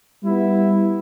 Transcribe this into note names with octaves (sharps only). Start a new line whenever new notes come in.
G3 B3 E4